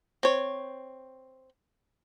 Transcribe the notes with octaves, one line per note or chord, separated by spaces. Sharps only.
C4 C#5